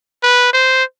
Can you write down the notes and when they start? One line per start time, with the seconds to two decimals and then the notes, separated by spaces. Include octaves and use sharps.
0.23 B4
0.53 C5